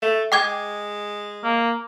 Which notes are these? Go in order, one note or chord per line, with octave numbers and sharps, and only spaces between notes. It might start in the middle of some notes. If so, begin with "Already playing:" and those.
A3
G#3 G5 D6 G#6
A#3